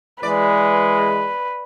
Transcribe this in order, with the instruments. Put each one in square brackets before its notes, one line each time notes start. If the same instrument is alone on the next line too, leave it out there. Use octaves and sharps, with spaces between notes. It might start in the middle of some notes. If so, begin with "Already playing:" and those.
[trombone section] E3 G#3 [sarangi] B4 [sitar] D5